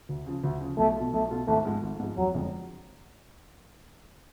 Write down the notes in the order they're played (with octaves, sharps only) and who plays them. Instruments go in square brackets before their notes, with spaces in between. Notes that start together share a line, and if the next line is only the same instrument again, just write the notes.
[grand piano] D2
C#3 F3
D2
C#3 F3
[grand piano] B1 [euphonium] A3
[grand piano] B2 A3 F4
[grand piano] B1 [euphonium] A3
[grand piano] B2 A3 F4
[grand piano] G#1 [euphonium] A3
[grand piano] G#2 F3 G#3
G#1
G#2 F3 G#3
[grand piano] F1 [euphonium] F#3
[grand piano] F2 D3 G#3